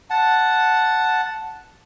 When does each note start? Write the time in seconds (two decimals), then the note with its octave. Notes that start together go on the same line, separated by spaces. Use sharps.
0.10 F#5 A5